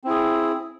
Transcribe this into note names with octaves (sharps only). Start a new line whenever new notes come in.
C4 E4 G#4